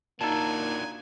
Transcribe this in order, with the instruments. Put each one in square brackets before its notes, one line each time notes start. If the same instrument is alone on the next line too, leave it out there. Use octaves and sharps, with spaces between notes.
[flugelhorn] A#3 [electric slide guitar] D4 F4 F#4 [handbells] D#4 A5 [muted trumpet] G#5